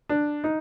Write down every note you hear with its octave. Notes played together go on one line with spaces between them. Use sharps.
D4
D#4